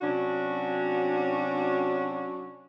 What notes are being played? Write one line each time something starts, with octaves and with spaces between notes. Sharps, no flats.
C3 F#3 C#4 D4 F#4